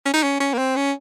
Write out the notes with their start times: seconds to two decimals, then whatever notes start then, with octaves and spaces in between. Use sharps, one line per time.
0.06 C#4
0.14 D#4
0.23 C#4
0.40 C#4
0.54 A#3
0.58 C4
0.76 C#4